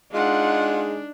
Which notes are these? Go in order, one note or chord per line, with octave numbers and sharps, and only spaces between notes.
G#3 D4 D#4 F4 F#5